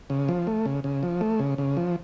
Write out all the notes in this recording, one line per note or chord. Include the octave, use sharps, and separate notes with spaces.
C#3
F3
A3
C#3
C#3
F3
A3
C#3
C#3
F3